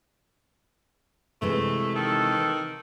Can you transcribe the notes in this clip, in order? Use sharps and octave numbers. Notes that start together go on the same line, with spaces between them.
C3 E3 G#3 A3
D#3 A4